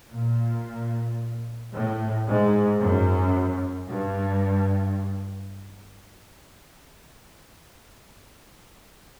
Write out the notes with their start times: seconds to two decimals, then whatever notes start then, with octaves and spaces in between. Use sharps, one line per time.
0.10 A#2
1.73 A2
2.26 G#2
2.80 F#2
3.88 G2